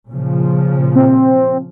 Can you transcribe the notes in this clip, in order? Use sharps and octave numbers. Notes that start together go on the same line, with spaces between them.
A#2 C#3 F3
C4